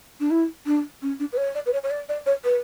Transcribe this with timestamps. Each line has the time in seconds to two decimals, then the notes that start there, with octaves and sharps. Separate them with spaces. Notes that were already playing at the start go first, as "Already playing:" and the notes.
0.20 D4
0.30 E4
0.66 D4
1.02 C#4
1.19 D4
1.32 B4
1.37 C#5
1.55 D5
1.66 B4
1.73 C#5
1.83 C#5
1.90 D5
2.09 D5
2.26 C#5
2.44 B4